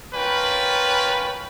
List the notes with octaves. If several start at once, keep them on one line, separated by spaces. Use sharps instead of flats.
C#4 F4 A#4 B4 G5